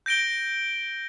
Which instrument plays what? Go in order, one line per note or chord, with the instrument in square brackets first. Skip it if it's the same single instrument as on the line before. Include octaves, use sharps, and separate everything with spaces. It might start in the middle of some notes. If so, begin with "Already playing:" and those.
[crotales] G6 A#6 D7 G7